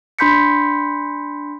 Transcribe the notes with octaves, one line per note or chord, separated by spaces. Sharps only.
D4 B5 C6 G6 B6 C#7